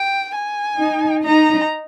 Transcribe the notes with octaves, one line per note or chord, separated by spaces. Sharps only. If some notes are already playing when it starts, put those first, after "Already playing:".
Already playing: G5
G#5
D#4
D#4 A#5